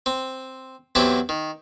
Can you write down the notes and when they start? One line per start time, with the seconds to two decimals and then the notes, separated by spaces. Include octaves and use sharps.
0.06 C4
0.95 E2 F#3 C4 E4 G4 A5
1.29 D#3